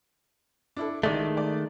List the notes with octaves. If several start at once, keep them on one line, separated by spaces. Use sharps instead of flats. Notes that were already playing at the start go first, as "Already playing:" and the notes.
D4 E4 A4
A1 D#3 G#3 A3 D5
D5